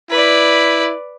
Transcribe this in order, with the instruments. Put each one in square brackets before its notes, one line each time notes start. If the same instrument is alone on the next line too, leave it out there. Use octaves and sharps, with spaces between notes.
[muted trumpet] E4 [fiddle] B4 D5